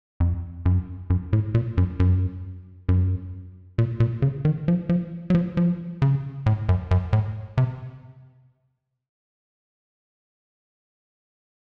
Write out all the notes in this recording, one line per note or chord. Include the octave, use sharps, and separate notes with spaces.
F2
F#2
F#2
A2
A#2
F#2
F#2
F#2
A#2
A#2
C#3
D#3
F3
F3
F#3
F3
F3
C#3
A2
F#2
F#2
A2
C3